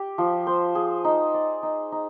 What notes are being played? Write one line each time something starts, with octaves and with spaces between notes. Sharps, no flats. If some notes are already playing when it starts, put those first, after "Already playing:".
Already playing: G4
F3
C5
G#4
D#4
D5
D#4
D#4